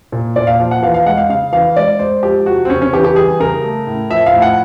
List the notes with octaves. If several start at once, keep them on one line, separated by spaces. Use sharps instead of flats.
A#2
A#2 D5
F5
F3
F#5
E3 F5
F5
G#3 F#5
F5
C#3 F5
E3 F5
G#3 D5
G#3 C5
F3 G4
C3 F#4
C4
C#3 C#4
C#4
E3 G4
G4
G3 G#4
C#3 A#4
A3
A2
F3 E5
F5
A2
F#5